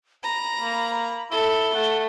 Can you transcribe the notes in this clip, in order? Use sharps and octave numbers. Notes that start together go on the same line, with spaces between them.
A#5 B5
A#3
E4 A4 G7
A3 F#5